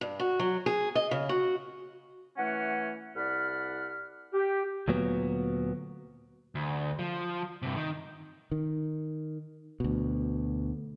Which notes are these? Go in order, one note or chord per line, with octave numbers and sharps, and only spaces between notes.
G2
F#4
F#3
G#4
D#5
C#3
F#4
E3 A3 C#4 F#5
C2 D5 F#5 B5 F6
G4
D2 A#2 F#3 B3
D2
F3
G2 C3
D#3
D#3
D2 B2